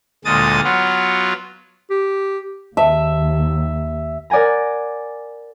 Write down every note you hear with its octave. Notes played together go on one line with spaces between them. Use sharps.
D2 A#2 G#3 D#6 A6
F#3 B3 F4
G4
D#2 E5 A5
A#4 D5 F#5 G#5 A#5